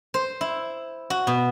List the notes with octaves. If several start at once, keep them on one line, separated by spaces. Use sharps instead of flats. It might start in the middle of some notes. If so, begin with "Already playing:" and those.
C5
E4
F#4
B2